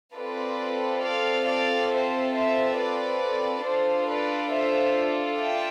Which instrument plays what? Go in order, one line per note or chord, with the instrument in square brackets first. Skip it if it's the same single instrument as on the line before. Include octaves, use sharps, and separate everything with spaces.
[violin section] C4 F4 A4 B4 D5
D5 F5
D5 F5
C5 E5
C5 E5
B4 D5
D4 F4 A4 C5
B4 D5
C5 E5
E5 G5